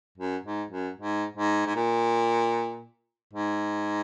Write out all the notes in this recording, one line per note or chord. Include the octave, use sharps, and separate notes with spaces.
F#2
G#2
F#2
G#2
G#2
G#2
A#2
G#2